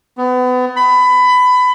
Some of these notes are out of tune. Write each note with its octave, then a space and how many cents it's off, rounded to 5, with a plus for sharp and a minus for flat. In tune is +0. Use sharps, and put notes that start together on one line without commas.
B3 +30
B5 +20